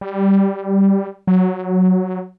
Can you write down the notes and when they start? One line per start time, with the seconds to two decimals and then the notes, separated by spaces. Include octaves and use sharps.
0.01 G3
1.27 F#3